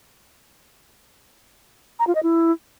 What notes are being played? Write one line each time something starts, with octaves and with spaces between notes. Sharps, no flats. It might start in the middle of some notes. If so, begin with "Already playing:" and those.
A#5
F4
D#5
E4